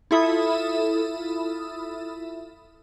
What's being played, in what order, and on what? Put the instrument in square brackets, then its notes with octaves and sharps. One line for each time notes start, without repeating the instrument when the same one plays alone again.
[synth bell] E4 F4 A4 E5 B5 D#6